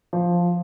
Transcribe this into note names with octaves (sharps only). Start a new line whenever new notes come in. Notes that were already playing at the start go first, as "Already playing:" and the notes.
F3